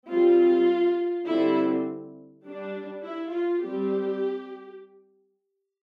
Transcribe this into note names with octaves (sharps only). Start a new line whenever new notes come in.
G3 C4 F4
D3 G3 C4 E4
G3 D4
E4
F4
G3 C4 G4